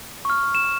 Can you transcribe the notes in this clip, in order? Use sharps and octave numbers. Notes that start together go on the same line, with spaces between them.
C#6 F6
E7